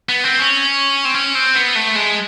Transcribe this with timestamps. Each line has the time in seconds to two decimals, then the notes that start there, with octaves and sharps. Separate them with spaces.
0.09 B3
0.24 C4
0.39 C#4
1.05 C4
1.14 C#4
1.35 C4
1.55 B3
1.75 A3
1.95 G#3